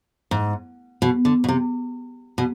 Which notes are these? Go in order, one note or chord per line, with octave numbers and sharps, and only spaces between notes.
G#2
B2
D3
B2
C3
B2